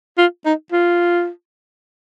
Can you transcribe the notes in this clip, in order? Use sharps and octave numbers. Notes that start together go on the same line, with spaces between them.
F4
D#4
F4